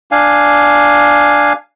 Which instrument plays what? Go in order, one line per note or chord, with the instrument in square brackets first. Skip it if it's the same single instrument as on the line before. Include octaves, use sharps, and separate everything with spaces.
[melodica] D4 F5 G#5